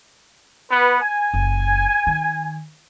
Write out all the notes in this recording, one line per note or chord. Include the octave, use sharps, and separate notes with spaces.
B3 B4
G#5
F#1
D#3